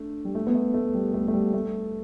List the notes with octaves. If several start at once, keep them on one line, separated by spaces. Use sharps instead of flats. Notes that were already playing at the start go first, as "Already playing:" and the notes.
Already playing: A3 D4
G3
A3
B3
A3
A3
G3
A3
A3
G3
A3